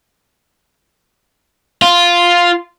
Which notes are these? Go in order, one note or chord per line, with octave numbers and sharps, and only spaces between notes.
F4